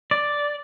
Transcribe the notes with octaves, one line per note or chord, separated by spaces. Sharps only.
D5